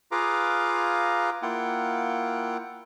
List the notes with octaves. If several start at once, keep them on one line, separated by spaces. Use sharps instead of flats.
F4 G#4 B4 F5 A#5 D6
A#3 E4 F4 F#5 G5